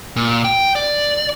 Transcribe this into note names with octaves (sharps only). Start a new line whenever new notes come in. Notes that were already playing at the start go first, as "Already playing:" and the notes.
A#2
G5
D5